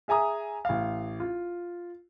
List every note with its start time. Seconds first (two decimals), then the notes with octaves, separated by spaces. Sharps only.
0.08 G#4 E5 G#5 A#5 D#6
0.65 A1 F5
1.20 F4